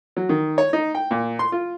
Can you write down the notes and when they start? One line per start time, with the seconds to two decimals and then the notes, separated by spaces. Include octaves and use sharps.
0.17 F#3
0.29 D#3
0.58 C#5
0.73 D#4
0.95 G5
1.11 A#2
1.39 C6
1.52 F4